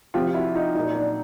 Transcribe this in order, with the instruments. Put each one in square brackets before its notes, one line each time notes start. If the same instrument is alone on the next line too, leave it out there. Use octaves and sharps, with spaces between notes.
[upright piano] C3 F3 F4 G4
E4 F#4
D#4 F4
A#2 F#3 D#4
D4